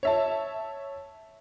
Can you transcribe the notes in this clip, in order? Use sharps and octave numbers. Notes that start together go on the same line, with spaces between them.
C#5 E5 A5